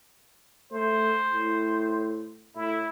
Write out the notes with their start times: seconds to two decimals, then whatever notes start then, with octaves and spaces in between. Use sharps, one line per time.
0.72 A3 C5
1.33 A2
2.55 A2 E4